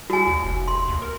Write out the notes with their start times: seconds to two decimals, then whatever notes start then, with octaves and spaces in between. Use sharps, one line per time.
0.10 G3 F#4 G#5
0.27 D#2
0.44 F1
0.68 C6
0.88 D#2
1.02 A#4